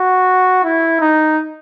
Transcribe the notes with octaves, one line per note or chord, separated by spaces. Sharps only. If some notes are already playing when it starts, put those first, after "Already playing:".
Already playing: F#4
E4
D#4